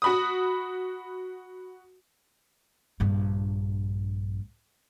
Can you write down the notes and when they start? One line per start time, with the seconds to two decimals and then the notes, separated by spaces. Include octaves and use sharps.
0.02 F#4 B5 D#6
3.00 A#1 G2